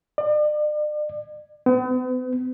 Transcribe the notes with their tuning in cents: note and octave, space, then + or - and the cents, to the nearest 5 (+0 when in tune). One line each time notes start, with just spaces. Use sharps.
D5 +40
B3 +45